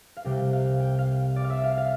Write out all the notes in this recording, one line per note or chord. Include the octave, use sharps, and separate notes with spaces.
F5
C2 C3 G3 G5
F5
G5
F5
D5
F5
E5
F5
F5